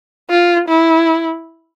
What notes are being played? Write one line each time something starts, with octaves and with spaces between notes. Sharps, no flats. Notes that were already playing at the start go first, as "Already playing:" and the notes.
F4
E4